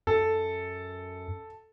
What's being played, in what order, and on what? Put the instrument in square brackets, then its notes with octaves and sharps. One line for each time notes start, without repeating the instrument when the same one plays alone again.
[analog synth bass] F#2 [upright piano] A4